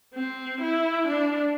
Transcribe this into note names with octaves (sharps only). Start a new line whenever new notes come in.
C4
E4
D4